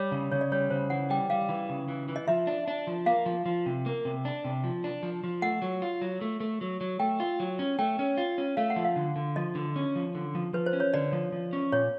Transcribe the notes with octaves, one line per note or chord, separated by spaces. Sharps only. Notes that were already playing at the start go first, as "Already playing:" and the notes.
Already playing: G3 C#5
C#3
C#3 C#5
D5
G3 C#5
C#3 C5
E3 F#5
G3 G5
G3 F5
E3
C#3
E3
E3
D#5
F3 E5
D4
D4
F3
A#3 F5
F3
F3
C3
A#3
C3
D4
C3
F3
D4
F3
F3
A3 F#5
F#3
F4
F#3
A3
A3
F#3
F#3
A3 G5
F4
F#3
C#4
A3 G5
C#4
F4
C#4
A3 F5
F#5
F3
F5
D3
D3
F3 D#5
D3
C#4
F3
D3
F3
F3 B4
C5
C#4
C#5
D3 D5
F3
F3
C#4
A#2 C#5